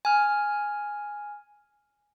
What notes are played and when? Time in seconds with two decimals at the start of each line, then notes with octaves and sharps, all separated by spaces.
0.05 G#5 F6